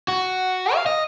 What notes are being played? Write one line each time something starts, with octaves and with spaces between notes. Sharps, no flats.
F#4
F5
D#5